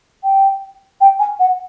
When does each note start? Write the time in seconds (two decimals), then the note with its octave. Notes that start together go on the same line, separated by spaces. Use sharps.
0.24 G5
1.01 G5
1.19 G#5
1.39 F#5